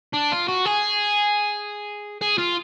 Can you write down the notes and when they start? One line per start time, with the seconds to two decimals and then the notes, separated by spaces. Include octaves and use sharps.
0.14 D4
0.32 F4
0.48 F#4
0.65 G#4
2.21 G#4
2.38 F4